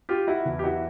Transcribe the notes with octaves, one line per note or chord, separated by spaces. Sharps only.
F4 G4
E4 F#4
E2 B2 F#3
G4
E4 F#4